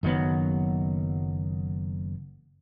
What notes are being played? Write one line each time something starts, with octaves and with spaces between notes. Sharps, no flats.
F#1 D#3 F#3 B3